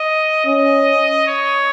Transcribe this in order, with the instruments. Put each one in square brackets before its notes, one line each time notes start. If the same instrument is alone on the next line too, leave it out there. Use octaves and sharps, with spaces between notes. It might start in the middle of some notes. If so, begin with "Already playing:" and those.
Already playing: [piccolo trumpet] D#5
[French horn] C#4 [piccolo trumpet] D#5
[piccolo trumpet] C#5